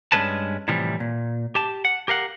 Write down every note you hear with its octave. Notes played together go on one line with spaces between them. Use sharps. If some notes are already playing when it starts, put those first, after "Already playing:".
G2 F#3 G#3 C#4 B4 A5
A2 C3 E3 F3 G3
A#2
G4 A5
F#5
G4 A#4 F5 F#5